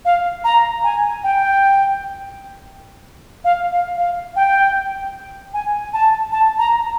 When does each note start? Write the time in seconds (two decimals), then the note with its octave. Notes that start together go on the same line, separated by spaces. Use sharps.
0.05 F5
0.44 A#5
0.84 G#5
1.23 G5
3.44 F5
3.72 F5
3.97 F5
4.36 G5
5.54 G#5
5.93 A5
6.32 A5
6.58 A#5